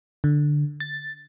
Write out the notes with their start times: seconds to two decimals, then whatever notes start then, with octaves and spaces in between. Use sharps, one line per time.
0.24 D3
0.80 A6